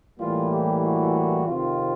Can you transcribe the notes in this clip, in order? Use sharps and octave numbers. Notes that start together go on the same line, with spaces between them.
A2 E3 G3 A#3 F4
G4
F#4
F2 C3 D#3 F4